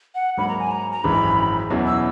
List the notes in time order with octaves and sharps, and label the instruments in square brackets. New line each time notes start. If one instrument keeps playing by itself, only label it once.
[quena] F#5
[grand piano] G#2 F#3 A#3 [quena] B5
[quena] A#5
G#5
A#5
A#5
[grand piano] G#1 F#2 E3 G#3 [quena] B5
[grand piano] E2 B2 F#3 C#4 E4
[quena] E6